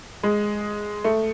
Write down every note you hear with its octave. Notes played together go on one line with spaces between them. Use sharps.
G#3
A3